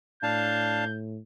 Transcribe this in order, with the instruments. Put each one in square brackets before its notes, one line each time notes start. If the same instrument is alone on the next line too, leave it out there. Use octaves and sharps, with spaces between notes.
[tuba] A2 [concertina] D4 F5 A5 [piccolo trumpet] G6